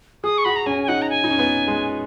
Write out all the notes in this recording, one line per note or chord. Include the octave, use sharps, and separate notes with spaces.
G#4 D#6
C#6
F#4 B5
A#5
C#4 G#5
G#5
D#4 F#5
A#5
G#5
D#4
C#4
B3
G#3